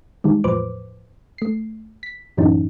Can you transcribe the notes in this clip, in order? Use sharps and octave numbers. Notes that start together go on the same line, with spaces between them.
D#3 G3 G#3
E2 A2 F3 B4 C5 D6
A3 C7
B6
F#2 A2 E3 F#3 C#4 D#4